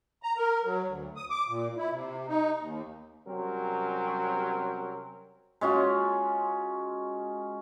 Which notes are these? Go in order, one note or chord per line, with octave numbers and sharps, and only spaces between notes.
A#5
A#4
F#3
D2
D#6
D6
A#2
E4
C3
D#4
D#2
C3 F#3 G3 C4 C#4 A#4
G#3 C#4 F4 F#4